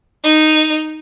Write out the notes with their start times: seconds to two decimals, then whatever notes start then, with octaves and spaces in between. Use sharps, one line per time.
0.22 D#4